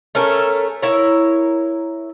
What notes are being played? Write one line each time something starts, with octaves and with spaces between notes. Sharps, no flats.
A3 C#4 A4 A#4
E4 A#4 C#5